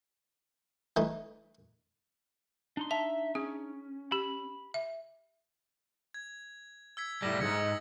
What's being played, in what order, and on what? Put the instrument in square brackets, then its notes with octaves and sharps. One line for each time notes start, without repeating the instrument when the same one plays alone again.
[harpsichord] E3 A3 D#4
[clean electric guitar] D4 D#4 C6
[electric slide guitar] E5 [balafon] A5
[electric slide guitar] C#4 [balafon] G#4
[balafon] G4 [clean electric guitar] B5
[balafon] E5
[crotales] G#6
E6 G#6 B6
[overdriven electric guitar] A2 G3 [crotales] A#6
[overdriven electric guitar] D2 G#2 [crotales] D#6 G#6 C#7